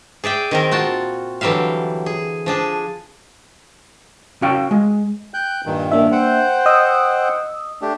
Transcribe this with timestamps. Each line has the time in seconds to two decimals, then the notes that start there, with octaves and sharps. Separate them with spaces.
0.24 G#4 D5 E5 G5
0.51 D#3 C4 A#4
0.71 A#2 F4 F#4 A5
1.41 D3 E3 F#3 G3 E5 F5
2.06 G#4
2.46 F3 D4 G#4
4.42 C#4 F#4 F5 G5
4.71 G#3
5.34 G5 F#6 G6
5.66 G2 A#2 D#3
5.92 A#3 D4 E5
6.12 C5 F#5 G5
6.66 D#5 D#6 E6
7.82 A3 D4 G4